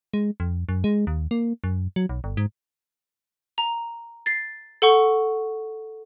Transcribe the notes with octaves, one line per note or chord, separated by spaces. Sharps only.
G#3
F2
F#2
G#3
D#2
A#3
F#2
F#3
B1
G1
G#2
A#5
A6 C7
A4 F#5 C#6